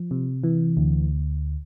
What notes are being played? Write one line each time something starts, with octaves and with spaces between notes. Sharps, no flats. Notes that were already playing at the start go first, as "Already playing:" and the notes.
Already playing: F3
C3
E3
D2